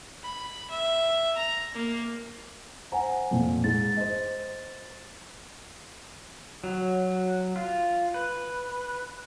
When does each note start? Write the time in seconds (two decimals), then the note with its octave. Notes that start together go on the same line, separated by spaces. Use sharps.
0.23 B5
0.70 E5
1.36 A#5
1.74 A#3
2.92 C5 F#5 G#5 A#5
3.31 F2 A#2
3.64 G#2 A6
3.96 C5 D#5
6.64 F#3
7.56 F4
8.14 B4